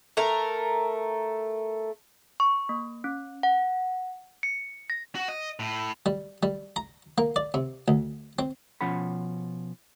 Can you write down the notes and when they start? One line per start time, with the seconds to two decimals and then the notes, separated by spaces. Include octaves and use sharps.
0.17 A3 A#4
2.40 C#6
2.69 A#3
3.04 C#4
3.43 F#5
4.43 C#7
4.90 A#6
5.15 F#4
5.28 D#5
5.60 A2
6.06 G3
6.43 G3
6.76 A#5
7.18 A#3
7.36 D5
7.54 C3
7.88 D2
8.39 C4
8.81 B2 F3 C#4 F#5 B5